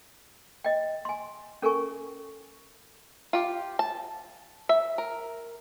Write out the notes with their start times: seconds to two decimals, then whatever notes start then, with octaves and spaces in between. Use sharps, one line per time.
0.64 D#5 G5
1.05 G#5 C6
1.62 C#4 A4 A#4 G#5 C#6
3.33 F4 G4
3.79 A5
4.69 E5
4.98 A#4